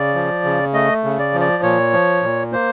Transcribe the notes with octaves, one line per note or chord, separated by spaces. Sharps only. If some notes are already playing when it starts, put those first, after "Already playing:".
Already playing: C#3 D5
F3
C#3
A3 D#5
C#3
D5
F3
D5
A#2 C#5
F3
A#2
A#3 C5